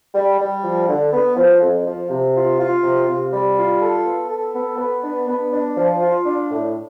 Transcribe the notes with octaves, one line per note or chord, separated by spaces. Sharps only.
G3
G3
F3
D3
B3
F3
F2
F3
C3
F4
F4
C3
C3
G3
F4
A4
B3
A4
B3
B3
D4
B3
D4
F3
F4
D4
A2